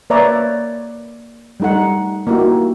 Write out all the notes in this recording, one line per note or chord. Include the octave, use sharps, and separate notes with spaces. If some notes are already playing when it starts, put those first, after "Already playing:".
A#3 B4 C#5 D5 E5 A#5
G3 A3 D#4 A4 F#5
A#3 D#4 E4 F#4 G4